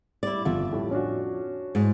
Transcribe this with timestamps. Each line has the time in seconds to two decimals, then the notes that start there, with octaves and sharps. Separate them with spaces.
0.23 G3 E4 D5
0.45 G1 F2 F4 E5
0.72 A2 G3
0.91 C#4 D4 F#4
1.75 G#2